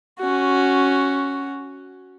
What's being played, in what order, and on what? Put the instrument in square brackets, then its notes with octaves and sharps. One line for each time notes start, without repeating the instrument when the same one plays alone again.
[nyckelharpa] C#4 F#4